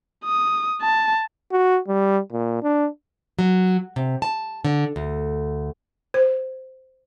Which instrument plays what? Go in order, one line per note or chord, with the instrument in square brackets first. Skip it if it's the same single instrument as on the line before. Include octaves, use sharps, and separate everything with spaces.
[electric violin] D#6
A5
[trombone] F#4
G3
A#2
D4
[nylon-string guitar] F#3
C3
A5
D3
D2
[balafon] C5